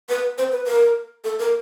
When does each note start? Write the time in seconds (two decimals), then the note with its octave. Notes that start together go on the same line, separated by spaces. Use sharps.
0.09 B4
0.38 C5
0.52 B4
0.67 A#4
1.24 A4
1.39 A#4